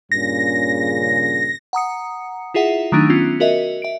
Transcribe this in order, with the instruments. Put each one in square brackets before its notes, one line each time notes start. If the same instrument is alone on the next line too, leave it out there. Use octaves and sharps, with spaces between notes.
[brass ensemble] G2 A#2 C#3 [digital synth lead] A#6
[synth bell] F#5 A#5 D#6 C#7
E4 F4 G#4 E5 F#5
D#3 F#3 A3 D4 D#4
B3 C#4 F4
F#4 A#4 D#5 E5
E5 D7